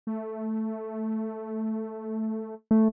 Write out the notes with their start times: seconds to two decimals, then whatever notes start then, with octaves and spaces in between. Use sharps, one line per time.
0.07 A3
2.71 A3